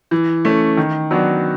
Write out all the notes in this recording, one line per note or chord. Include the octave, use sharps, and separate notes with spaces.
E3
A3 C#4
D#3
F#3 B3 D4 F#4